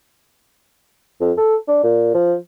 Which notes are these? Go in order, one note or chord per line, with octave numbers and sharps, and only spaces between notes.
F2
A4
D4
A#2
F3